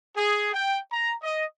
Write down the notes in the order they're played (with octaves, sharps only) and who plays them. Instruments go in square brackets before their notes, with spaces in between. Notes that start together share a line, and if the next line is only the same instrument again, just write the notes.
[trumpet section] G#4
G5
A#5
D#5